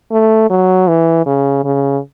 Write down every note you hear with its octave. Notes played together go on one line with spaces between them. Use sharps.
A3
F#3
E3
C#3
C#3